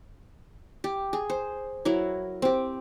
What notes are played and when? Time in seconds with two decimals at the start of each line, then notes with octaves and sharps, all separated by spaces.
0.84 G4
1.13 G#4
1.30 C5
1.85 F#3 E4 A#4
2.42 C4 G4